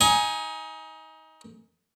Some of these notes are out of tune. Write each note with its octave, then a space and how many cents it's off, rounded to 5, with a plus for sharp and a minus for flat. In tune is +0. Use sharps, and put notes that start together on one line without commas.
D#4 +25 G#5 +0